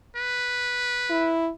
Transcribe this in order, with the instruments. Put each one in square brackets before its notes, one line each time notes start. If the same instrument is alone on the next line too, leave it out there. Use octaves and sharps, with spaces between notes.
[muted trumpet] B4
[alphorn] E4